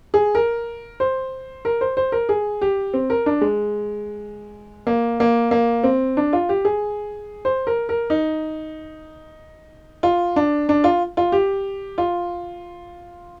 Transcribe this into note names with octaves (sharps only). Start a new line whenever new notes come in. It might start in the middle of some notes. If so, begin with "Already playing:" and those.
G#4
A#4
C5
A#4
C5
C5
A#4
G#4
G4
C4
A#4
D4
G#3
A#3
A#3
A#3
C4
D4
F4
G4
G#4
C5
A#4
A#4
D#4
F4
D4
D4
F4
F4
G4
F4